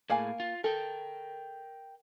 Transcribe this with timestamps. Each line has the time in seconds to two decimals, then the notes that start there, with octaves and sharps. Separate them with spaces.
0.10 A2 A#3 G#4 F5 G#5
0.40 F4
0.64 A4 A#4 G5